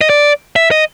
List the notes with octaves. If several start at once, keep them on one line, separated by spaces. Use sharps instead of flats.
D#5
D5
E5
D#5